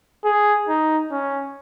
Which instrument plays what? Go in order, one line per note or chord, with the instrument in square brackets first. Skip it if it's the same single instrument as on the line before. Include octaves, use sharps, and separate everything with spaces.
[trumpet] G#4
D#4
C#4